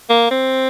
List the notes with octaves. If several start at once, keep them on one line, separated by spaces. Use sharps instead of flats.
A#3
C4